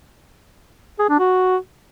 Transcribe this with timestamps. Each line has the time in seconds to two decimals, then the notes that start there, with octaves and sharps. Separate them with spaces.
0.99 G#4
1.09 D4
1.19 F#4